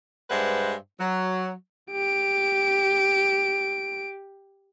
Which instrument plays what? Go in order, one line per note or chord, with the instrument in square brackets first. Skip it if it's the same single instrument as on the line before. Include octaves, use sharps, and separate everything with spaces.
[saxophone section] G2 G#3 B4 C5 E5 F#5
F#3
[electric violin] G4 D7